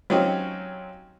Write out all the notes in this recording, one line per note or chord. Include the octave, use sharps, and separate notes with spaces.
F#3 C4 C#4 D#4 F4 G4